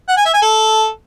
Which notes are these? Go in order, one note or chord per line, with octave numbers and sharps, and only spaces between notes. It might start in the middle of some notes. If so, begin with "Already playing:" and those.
F#5
G#5
E5
G#5
A4